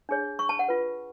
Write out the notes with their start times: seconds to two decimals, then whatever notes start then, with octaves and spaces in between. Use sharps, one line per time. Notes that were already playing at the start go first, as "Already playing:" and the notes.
0.09 D4 G#4 C#5
0.39 C#6
0.49 A5
0.59 F#5
0.69 F4 B4